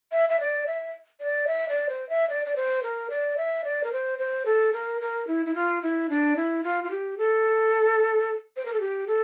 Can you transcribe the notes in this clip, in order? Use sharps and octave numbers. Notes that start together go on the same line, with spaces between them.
E5
E5
D5
E5
D5
E5
D5
C5
E5
D5
D5
C5
A#4
D5
E5
D5
A#4
C5
C5
A4
A#4
A#4
E4
E4
F4
E4
D4
E4
F4
F4
G4
A4
C5
A#4
A4
G4
A4